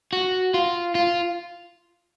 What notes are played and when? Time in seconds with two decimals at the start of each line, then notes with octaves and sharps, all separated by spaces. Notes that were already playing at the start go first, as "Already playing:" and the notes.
0.13 F#4
0.54 F4
0.95 F4